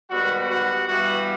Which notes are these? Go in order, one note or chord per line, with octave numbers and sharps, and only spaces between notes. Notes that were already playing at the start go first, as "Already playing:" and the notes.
G#2 D#3 G3 B3 F#4
F#4
G2 E3 G3 B3 F#4